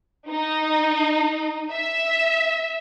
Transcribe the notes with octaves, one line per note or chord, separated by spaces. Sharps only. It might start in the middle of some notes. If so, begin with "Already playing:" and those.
D#4
E5